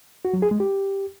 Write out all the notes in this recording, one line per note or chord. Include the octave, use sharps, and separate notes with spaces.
F#4
F#3
G#4
G#3
G4